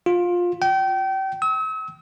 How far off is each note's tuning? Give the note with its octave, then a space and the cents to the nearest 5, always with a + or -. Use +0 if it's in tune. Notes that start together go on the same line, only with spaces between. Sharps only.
F4 +15
G5 -30
E6 -45